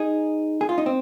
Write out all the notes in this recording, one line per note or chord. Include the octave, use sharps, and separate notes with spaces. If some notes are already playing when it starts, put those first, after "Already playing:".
Already playing: D#4 G#4
G#4
F4
D#4
C4